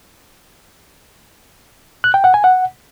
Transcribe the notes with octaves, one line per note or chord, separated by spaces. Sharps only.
F#6
G5
F#5
G#5
F#5